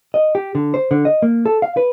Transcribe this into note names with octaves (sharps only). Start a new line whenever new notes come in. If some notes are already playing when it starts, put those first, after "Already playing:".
D#5
G4
D3
C5
D3
D#5
A#3
A4
F5
B4